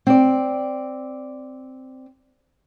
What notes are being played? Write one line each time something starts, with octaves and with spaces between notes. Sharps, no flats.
C4 D5